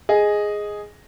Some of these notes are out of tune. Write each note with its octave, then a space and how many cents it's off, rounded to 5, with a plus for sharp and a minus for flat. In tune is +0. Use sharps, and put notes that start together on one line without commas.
G#4 +0 D#5 +0